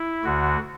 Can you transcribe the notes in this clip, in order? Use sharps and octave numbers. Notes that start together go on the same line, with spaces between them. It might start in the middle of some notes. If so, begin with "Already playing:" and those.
Already playing: E4
D2 D3 F#4